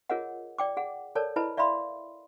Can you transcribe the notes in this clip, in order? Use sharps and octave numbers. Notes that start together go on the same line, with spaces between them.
F4 G#4 A#4 C#5 D#5 F#5
D5 G5 D6
G#4 F#5
A4 A#4 C#5 D5 A5
E4 B4 D#5 A5 B5
D5 E5 F5 B5 C6